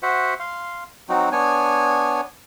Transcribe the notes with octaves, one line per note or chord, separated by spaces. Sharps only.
F#4 C5 E5 F#5
F5 C6
F#3 C4 D#4 F#4
B3 D4 C#5 G#5